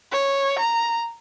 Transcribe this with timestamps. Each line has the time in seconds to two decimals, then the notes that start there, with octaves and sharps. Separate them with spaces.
0.12 C#5
0.59 A#5